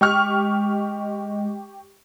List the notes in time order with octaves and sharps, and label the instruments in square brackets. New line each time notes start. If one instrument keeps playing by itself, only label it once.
[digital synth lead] G#3 [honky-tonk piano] G4 C#6 F6